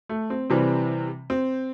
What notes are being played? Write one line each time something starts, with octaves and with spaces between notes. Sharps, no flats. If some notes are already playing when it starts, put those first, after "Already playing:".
A3
C4
C3 E3 G3 C4
C4